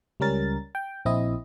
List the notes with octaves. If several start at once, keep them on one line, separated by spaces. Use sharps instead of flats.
C#2 G3 C#4 A#4 A6
G5
A#1 C4 E4 D#5